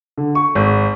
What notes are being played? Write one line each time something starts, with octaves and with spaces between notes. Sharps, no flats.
D3
C#6
G#1